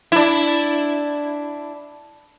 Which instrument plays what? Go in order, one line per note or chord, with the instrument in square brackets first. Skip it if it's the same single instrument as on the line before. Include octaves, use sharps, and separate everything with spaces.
[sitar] D4 E4